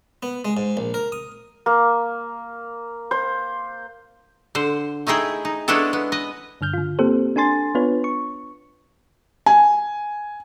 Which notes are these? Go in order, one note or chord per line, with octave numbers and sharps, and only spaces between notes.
B3
G#3
G#2
A#1
A#4
D#6
A#3
C5
D3 C5
A3 D#4 E4 G#4 G5
D#4
G#3 B3 C#4 D4 E4 A4
B3
B4 D#5
G2 D3 F6 G6
D3 F4
A#3 C4 G4 A4 C5
D4 A4 G#5 C6 A6
B3 D4 F4 B4 C#5
C#6
G#5